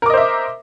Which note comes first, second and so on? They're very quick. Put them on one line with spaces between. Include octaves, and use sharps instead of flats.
A#4 D6 D#5 C5 E5